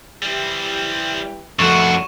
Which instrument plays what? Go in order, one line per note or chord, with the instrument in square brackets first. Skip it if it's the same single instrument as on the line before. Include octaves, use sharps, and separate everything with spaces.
[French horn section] E3 E4 G4 [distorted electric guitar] G3 C4
[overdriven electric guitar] F2 F#4 [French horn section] A3 [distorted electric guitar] D4 [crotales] C#6 E7